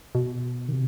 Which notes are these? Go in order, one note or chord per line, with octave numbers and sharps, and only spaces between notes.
B2
D#3
C3